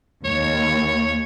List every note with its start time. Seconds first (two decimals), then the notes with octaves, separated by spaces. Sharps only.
0.25 D#2 C#5